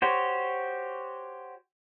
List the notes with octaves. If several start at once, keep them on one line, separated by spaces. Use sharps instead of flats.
F#4 G4 C5 C#5